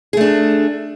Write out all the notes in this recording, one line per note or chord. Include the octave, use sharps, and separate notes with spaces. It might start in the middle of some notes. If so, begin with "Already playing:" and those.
A3 D4 G#4